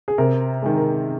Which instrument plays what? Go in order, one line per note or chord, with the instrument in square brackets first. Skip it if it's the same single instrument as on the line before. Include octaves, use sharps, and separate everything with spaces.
[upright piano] G#4
C3 A#4
D#3 G#3
A#4